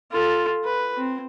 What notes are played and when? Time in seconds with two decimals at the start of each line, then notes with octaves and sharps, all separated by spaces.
0.12 F4 A4
0.64 B4
0.97 C4